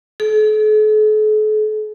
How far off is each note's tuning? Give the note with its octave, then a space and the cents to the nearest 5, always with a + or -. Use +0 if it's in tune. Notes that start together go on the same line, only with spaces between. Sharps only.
A4 -45